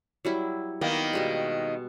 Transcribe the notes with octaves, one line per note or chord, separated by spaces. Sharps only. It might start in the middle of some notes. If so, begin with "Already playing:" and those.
F#3 G3 E4
D#3 A#3 B3 B4 D5
B2 G3 G#3